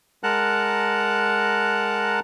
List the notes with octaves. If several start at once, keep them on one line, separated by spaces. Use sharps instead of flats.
G#3 A#4 F#5 A5 A#5 F#6